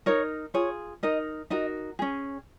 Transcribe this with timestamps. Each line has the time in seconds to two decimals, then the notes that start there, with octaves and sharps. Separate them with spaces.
0.06 D#4 A#4 C#5
0.54 F4 G#4 C#5
1.03 D#4 A#4 D#5
1.50 D#4 F#4 A#4 D#5
1.99 C#4 G#4